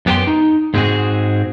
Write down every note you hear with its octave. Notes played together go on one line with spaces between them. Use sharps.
F#2 B3 G4 A4 G5 C6
D#4
G#2 G#3 C4 E4 F#4 G#4